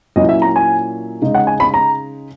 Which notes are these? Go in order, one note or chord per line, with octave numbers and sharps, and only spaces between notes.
A#2 F#3 C#4 E4 D#5
E5
A#5
G#5
C#3 G#3 D#4
F#5
G#5
B5
A#5